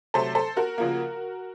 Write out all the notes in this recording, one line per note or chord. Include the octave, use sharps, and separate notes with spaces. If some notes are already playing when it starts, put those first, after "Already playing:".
C3 F#3 A3 A4 C5
A4 C5
F#4 A#4
C#3 F3 A#3